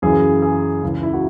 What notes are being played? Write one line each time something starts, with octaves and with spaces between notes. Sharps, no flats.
F#2 C#3 E3 G#4
G#4
C#2 C#3 E3
E4
F#4